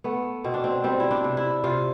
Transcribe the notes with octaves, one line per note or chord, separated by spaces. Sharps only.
A3 B3
B2 C4
D4
C4
G3 C4
E4
D4
C3
E4
C3 F4